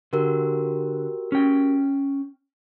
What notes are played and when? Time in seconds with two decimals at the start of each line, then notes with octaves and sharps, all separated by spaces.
0.13 D3 F#4 G4 A#4
1.32 C#4 G5